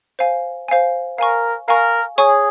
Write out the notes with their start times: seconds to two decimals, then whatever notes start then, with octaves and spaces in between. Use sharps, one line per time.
0.19 C5 F5 G#5
0.68 C5 F5 G#5
1.18 A#4 F5 G#5 C#6
1.68 A#4 F5 G#5 C#6
2.18 G#4 C#5 G#5 C#6